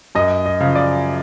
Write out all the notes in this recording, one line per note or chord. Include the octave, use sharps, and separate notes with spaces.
F#2 D#5
D#5
C#3 F3
D5